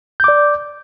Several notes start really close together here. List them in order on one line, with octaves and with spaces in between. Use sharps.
G6 D6 D5